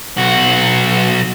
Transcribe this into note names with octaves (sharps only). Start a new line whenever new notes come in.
B1 F#4